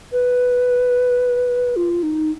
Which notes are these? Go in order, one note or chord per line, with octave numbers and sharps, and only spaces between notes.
B4
F4
D#4